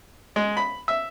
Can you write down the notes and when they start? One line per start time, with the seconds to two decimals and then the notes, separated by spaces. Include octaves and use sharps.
0.36 G#3
0.57 B5
0.88 E5